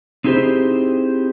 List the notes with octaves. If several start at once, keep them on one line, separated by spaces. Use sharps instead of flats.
C4 D#4 E4 G4 G#4 C5